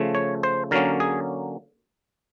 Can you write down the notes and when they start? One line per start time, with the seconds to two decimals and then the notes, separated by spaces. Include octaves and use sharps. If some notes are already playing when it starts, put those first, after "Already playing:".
Already playing: C#3 F3 A3
0.15 C#5
0.43 C5
0.71 D3 F#3 A#3 C#4 A#4
1.00 G#4